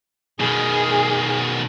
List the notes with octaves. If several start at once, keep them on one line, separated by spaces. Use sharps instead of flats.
B2 D#3 G#4